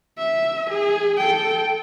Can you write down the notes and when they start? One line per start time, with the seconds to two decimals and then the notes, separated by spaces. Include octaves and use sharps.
0.19 E5
0.70 G#4
1.17 A4 G5